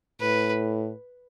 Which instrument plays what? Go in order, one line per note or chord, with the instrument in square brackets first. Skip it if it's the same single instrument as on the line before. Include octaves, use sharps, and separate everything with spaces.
[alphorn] A2 [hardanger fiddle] B4